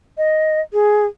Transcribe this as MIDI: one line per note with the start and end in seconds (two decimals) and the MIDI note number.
0.18 0.60 75
0.73 1.05 68